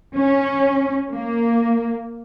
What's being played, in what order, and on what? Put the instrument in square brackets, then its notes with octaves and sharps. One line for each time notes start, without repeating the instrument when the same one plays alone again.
[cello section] C#4
A#3